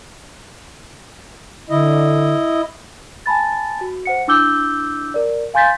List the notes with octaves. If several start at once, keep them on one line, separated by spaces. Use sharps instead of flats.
D3 E4 D#5
G#5 A5 B5 A6
F#4
C5 F#5 C#7
D4 E4 D6 E6 G6 G7
A#4 D5
F5 G#5 C6 G6 A6 B6